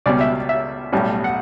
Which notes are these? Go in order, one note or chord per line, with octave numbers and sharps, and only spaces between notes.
C#2 B2 G3 C#4 D5
E5
E5
B1 A2 G3 C#4
F#5